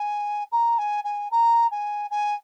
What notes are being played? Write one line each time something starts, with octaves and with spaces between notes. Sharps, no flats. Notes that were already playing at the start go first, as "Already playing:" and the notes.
Already playing: G#5
A#5
G#5
G#5
A#5
G#5
G#5